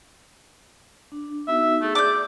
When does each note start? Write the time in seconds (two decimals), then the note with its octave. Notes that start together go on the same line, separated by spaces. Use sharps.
1.12 D4
1.48 B3 D#4 F#4 E5
1.82 A3 G#4 D#6 E6
1.95 D5 D6 G6